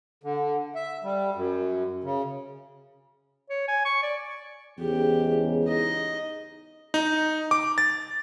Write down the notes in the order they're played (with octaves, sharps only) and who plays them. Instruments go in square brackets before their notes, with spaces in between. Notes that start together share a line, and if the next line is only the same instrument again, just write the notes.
[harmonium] D3
E5
G3
F#2
C#3
[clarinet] C#5
G#5
C#6
D5
[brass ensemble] E2 G#2 C#3 [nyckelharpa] G4
[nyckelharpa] D#4 D#5
[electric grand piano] D#4
D6
A6